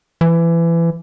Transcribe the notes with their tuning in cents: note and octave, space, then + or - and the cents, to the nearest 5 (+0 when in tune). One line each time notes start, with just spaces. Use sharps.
E3 +25